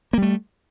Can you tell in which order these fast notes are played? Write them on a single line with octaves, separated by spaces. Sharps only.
A#3 G3 A3